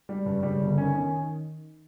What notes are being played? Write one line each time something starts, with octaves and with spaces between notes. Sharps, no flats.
G3
G2 C#3
G3
G1
D#3 C#4
C#4